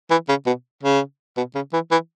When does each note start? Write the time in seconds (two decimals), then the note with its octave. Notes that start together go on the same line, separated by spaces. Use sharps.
0.11 E3
0.29 C#3
0.47 B2
0.83 C#3
1.37 B2
1.55 C#3
1.73 E3
1.92 E3